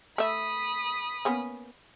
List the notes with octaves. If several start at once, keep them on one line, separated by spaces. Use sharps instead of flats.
A3 E5 B5 D#6
A#3 B3 C#4